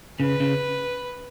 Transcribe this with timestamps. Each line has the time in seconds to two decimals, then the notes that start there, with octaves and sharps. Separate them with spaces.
0.20 C#3 B4
0.40 C#3